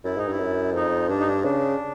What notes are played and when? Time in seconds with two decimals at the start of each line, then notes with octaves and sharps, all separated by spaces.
0.05 F#2 E4
0.16 G#2 D#4
0.28 G2 E4
0.39 F#2
0.75 F2 D#4
1.09 G2 D4
1.20 D#4
1.27 D4
1.44 C#3 D4